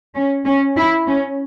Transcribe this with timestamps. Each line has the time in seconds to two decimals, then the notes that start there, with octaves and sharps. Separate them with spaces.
0.15 C#4
0.45 C#4
0.76 E4
1.06 C#4